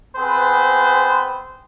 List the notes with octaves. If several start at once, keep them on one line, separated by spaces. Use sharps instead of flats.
B3 C4 G#4 B4 C5